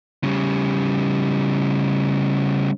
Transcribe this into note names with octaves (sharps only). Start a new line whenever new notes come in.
C#3 G3